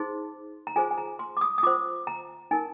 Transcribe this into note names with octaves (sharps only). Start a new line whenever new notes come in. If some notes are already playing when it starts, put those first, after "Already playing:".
Already playing: D#4 G#4 C5 C6
A#5
F4 G#4 C5 G#5
G#5
A#5
C6
D6
D#6
D#6
F4 C5 D6
A#5
D#4 A#4 G#5